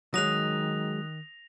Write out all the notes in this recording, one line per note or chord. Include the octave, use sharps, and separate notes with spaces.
D#3 F#3 G#3 D#6 F#6 A#6 F7